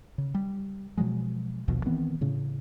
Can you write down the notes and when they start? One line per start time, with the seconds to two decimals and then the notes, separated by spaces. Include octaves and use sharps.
0.18 C#3
0.34 G3
0.98 B2 F3 F#3 G#3
1.68 A#1 D#2 B2 F3
1.86 D#3 E3 B3 C4
2.21 A2 C#3